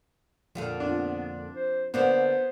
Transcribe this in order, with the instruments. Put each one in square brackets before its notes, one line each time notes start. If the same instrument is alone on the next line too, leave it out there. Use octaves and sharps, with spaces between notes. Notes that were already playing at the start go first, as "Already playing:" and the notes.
[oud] F2 A#2 D3 [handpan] F3 F5
[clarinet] B3 [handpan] C4 F4 [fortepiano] D4
[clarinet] C5
[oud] D3 A#3 D4 [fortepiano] B3 [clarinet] C5